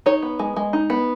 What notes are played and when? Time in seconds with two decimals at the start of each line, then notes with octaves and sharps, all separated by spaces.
0.06 D#4 C#5
0.22 B3
0.39 G#3
0.56 G#3
0.73 D#4
0.90 B3